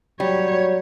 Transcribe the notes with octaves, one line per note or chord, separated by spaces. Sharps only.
F#3 G3 C#5